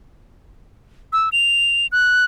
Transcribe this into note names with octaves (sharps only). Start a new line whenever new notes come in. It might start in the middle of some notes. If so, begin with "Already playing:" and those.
E6
F7
F#6